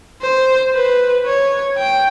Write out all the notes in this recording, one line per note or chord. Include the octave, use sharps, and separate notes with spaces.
C5
B4
C#5
G5